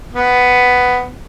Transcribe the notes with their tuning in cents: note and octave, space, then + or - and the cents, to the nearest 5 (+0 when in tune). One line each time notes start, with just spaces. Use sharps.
B3 +5